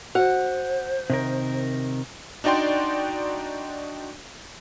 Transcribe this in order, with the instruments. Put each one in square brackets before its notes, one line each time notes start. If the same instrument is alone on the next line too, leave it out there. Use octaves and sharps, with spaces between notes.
[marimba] F#4 [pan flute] C5 [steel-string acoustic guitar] F#5
[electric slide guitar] C3 D#3 A#4
[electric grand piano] D4 D#4 F#4 D5 G5 C6